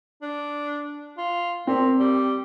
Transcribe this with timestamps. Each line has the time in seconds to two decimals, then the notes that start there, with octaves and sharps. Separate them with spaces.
0.22 D4
1.17 F4
1.67 A#2 C4
1.99 G3